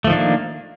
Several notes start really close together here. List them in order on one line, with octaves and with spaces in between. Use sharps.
A3 F3 D#3 D4 A#3